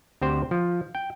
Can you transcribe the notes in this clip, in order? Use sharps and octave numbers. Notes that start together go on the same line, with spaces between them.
D2 C4 G4 C5
F3
G5